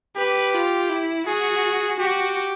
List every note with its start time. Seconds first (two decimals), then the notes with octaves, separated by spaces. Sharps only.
0.16 G4 B4
0.54 F4
0.89 E4
1.26 F#4 G#4
1.99 F#4 G4